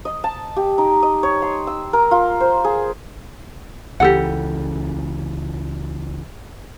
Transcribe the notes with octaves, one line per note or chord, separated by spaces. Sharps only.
D#5
A5
G4
D#4
D#5
C#5
C6
E6
A#4
F4
C5
G#4
C#2 C#3 E3 G4 A4 F#5